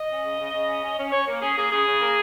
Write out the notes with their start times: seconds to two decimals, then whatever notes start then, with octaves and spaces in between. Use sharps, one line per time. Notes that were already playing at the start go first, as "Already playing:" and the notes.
Already playing: D#5
0.09 C#4
0.23 C#3
0.38 C#3
0.52 C#3
0.67 C#4
0.82 C#4
0.97 C#4
1.11 C#4 C#5
1.27 A#3
1.41 C#4 G#4
1.57 A#3 G#4
1.71 C#3 G#4
1.86 C#3
2.00 A#3